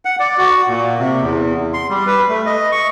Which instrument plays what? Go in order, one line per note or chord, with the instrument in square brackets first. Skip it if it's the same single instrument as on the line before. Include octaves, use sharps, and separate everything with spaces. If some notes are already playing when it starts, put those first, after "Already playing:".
[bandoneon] F#5
D5
F#4
A#2
C3
E2
C6
G3
B4
A3
D#5
C#6